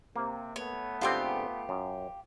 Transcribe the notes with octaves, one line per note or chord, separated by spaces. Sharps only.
C3 A#3
A3 B3 C#5
G#2 D3 C4 F4 G4 C6
F#2